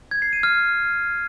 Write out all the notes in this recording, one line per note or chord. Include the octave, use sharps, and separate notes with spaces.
G#6
C7
D#7
F6